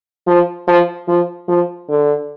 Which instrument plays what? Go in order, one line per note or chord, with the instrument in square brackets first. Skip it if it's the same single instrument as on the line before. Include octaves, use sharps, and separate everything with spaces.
[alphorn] F3
F3
F3
F3
D3